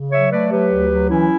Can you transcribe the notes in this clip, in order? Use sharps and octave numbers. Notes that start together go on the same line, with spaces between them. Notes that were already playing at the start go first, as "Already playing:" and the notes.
Already playing: C#3
F#3 C#5 E5
A3 B4 D5
F#3 G4 B4
D2
F#3
E3 C#4 E4